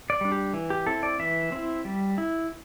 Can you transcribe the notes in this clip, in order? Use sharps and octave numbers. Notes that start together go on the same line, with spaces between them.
D5
G3 D4
G4
E3
G4
C4 E4 A4
D5
E3 E5
C4 E4
G3
E4